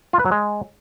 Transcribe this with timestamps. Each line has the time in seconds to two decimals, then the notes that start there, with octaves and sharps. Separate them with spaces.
0.13 F4
0.19 B4
0.25 F#3
0.31 G#3